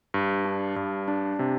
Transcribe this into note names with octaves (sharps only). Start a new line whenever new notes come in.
G2
D4
G2
D4
C3